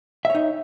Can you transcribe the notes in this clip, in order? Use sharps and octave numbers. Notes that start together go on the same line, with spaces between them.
D#4 C#5 E5